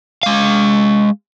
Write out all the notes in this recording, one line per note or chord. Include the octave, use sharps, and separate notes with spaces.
G#3 F5